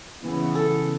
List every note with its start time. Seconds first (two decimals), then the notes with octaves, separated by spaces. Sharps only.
0.21 C#3 E3 B3
0.55 A4